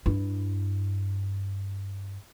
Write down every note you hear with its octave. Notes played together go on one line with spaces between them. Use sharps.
G2 E4